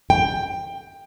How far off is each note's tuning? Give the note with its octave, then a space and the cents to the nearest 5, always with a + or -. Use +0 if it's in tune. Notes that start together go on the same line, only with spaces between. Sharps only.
G5 +10